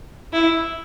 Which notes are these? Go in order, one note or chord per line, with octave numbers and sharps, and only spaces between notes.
E4